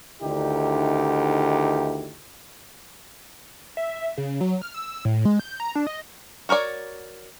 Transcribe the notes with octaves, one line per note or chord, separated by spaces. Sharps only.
D2 D3 D#3 D#4 E4 G4
E5
C#3
F#3
F6
E6
A2
G#3
G6
A#5
D4
D#5
F#4 A#4 C#5 D5